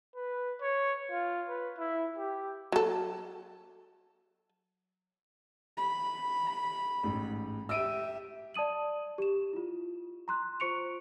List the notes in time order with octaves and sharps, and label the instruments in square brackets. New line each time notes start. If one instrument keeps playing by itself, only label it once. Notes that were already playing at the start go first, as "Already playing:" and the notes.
[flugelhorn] B4
C#5
F4
B4
E4
G4
[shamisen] F#3 A4
[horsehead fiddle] B5
[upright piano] A1 G#2
[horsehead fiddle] G4 E5 [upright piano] E6 D7 D#7
[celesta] D5 A5 D#6 D#7 F#7
G4 E7
E4 F4
A#5 C6 F#6
F4 C5 C#6 C#7 D7 F7